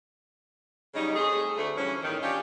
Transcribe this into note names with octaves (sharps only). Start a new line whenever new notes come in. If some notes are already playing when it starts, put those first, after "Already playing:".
C#3 F#3 G3 D#4
A3 C4 G#4
D2 A3
G2 E3 F3 C#4
E2 A2 D#3
C#4 D4 F4 G4